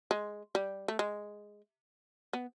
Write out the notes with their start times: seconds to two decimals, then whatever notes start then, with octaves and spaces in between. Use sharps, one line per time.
0.11 G#3
0.55 G3
0.88 A3
0.99 G#3
2.33 B3